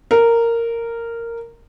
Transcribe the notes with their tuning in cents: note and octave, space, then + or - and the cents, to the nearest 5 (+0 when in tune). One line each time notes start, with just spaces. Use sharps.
A#4 -10